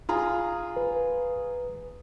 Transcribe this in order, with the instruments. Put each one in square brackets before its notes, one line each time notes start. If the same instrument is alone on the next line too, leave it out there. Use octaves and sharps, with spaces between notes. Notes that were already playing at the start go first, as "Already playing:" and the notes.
[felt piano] F4 G#4 A#5
[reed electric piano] B4